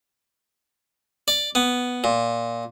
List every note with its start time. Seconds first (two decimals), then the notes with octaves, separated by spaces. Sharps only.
1.28 D5
1.55 B3
2.04 A#2